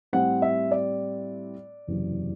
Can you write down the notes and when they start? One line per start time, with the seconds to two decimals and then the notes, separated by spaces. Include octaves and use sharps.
0.13 A2 G3 C4 F#5
0.42 E5
0.71 D5
1.87 F#1 E2 C3 F#3